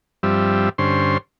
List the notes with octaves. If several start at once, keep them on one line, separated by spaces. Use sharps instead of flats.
G2 F3 G3 C4 E5
G2 D3 C#4 C5 C6